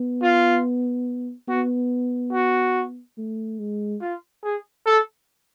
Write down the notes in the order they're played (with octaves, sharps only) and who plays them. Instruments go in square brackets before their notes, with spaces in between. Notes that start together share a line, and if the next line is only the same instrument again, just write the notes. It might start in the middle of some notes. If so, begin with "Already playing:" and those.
Already playing: [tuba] B3
[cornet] F4
[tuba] B3 [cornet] F#4
[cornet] F#4
[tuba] A3
G#3
[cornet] F4
G#4
A4